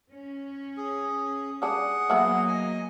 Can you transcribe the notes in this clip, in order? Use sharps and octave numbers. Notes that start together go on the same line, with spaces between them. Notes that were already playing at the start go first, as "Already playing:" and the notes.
C#4
G#4
G3 D4 G#4 F#5 D#6
F#3 A#3 B3 E4
D#5 G#5